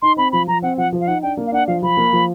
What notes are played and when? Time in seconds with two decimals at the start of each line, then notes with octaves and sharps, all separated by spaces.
0.02 D#4 C6
0.17 C4 B5
0.32 F3 B5
0.47 F3 A#5
0.62 C4 F#5
0.77 F3 F#5
0.93 F3
1.00 F5
1.07 D#4 F#5
1.22 D4 G5
1.37 A#3
1.47 F5
1.52 D4 F#5
1.67 F3 F5
1.82 F3 B5
1.97 A#3
2.13 F3